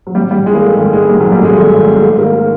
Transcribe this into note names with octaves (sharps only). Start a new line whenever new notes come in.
F#3
G#1 G3
G#1 G3
E3 G#3
A#3
G#2 A3
G#1 G#3
G#2 G#3
G#1 G3
F#3
G#1
G3
G#2 G#3 A3
G#1 A3
G#1
G#2
G#2 A3
D#3 A#3